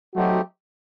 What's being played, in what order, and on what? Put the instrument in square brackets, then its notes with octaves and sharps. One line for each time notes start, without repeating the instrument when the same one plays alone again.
[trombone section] F#3 F#4 [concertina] A3 C4 D#4 G4